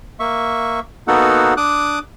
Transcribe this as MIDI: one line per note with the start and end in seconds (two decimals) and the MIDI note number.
0.20 0.80 58
0.20 0.80 76
0.20 0.80 85
1.08 1.54 58
1.08 1.54 59
1.08 1.54 63
1.08 1.54 66
1.08 1.54 69
1.08 1.54 78
1.57 1.99 62
1.57 1.99 86
1.57 1.99 87
1.57 1.99 90